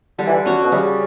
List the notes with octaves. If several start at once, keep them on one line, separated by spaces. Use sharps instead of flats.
D3 G3
E3
D3
C#4 F#4
B2
C#3 G3